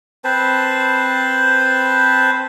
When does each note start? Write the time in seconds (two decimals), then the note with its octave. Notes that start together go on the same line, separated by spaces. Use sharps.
0.25 C4 B4 C5 A5